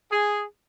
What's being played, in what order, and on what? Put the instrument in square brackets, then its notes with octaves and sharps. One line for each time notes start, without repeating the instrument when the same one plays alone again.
[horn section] G#4